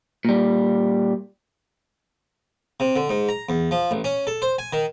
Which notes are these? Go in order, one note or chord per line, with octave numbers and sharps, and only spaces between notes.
A#2 G3
C3
D3
G#2
A#5
E2
F3
A1
C#4
A4
C5
G#5
D#3